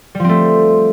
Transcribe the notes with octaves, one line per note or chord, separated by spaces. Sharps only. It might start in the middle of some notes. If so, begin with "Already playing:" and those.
F3 G3 A3 C4